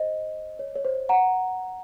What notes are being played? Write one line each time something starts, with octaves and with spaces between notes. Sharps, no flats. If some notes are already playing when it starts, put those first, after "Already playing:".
Already playing: C5 D#5
C#5
C#5
C5
F#5 A#5